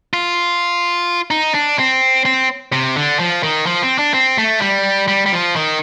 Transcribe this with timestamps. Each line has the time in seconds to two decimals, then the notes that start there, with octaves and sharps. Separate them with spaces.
0.14 F4
1.31 D#4
1.54 D4
1.79 C4
2.25 C4
2.73 C3
2.96 D3
3.19 F3
3.43 D#3
3.66 F3
3.83 C4
3.99 D4
4.14 C4
4.38 A3
4.61 G3
5.08 G3
5.26 G3
5.33 F3
5.56 D#3